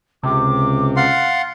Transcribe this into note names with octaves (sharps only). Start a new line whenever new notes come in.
C#2 C3 D6
F5 F#5 C6 A6